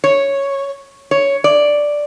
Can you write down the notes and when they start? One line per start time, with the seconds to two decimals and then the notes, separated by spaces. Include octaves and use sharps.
0.04 C#5
1.11 C#5
1.44 D5